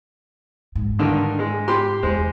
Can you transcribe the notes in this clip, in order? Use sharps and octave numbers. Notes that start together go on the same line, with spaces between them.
G#2
G2 D3 D#3
G#3
G4 B5 C6
E2 E3 G#3 C5